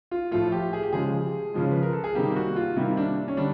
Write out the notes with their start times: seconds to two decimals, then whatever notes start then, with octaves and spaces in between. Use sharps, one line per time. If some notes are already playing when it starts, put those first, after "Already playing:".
0.11 F4
0.31 A2 F3 A3 F4
0.52 G4
0.73 G#4
0.83 G4
0.93 C#3 F3 G#3 G#4
1.54 C#3 F3 G#3
1.71 B4
1.83 A#4
1.93 A4
2.04 G#4
2.15 C3 D#3 G3 A#3 G4
2.36 F#4
2.56 F4
2.77 C3 D#3 G3 A#3 E4
2.97 D4
3.28 C#4
3.37 D3 G3 D4